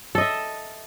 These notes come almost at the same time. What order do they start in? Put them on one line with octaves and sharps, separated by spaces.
A4 D#5 E5